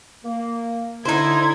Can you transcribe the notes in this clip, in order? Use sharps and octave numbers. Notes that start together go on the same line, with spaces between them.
A#3
D3 D#4 E4 C5 G#6